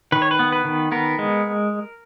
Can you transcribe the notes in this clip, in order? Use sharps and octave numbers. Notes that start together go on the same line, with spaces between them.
D#3 B4
C#5
B4
B3
B4
D#3
B3 A#4
G#3